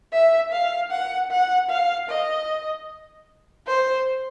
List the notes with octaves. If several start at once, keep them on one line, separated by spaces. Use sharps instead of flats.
E5
F5
F#5
F#5
F5
D#5
C5